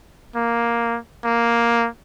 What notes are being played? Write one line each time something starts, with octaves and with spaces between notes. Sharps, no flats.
A#3
A#3